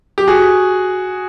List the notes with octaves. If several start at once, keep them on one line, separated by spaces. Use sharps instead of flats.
G4
F#4 G#4